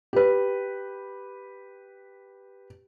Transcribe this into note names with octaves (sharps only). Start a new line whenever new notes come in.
G4 B4